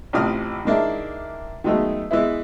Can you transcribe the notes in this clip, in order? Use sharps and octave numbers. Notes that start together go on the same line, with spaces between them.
A1 F2 A2 C3 D#6 F6
D#3 G#3 A#3 D4 E4
D#3 F#3 G#3 A3 B3
E3 G#3 B3 E4